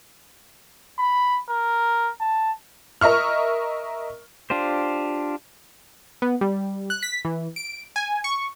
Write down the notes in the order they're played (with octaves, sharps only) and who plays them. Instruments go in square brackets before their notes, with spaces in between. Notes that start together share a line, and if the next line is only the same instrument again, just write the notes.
[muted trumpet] B5
A#4
A5
[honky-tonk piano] A#4 D#5 E5 C#6 F6
[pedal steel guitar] D4 F4 G4 C5
[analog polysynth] B3
G3
F#6
B6
E3
D7
G#5
C#6